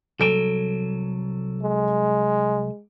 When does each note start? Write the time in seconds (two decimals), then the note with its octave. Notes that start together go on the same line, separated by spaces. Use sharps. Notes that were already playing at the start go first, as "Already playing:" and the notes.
0.20 C2 F#3 A4 D7
1.62 G#3